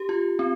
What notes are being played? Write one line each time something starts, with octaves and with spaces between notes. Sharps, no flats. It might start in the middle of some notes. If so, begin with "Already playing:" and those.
Already playing: G4
F4
C4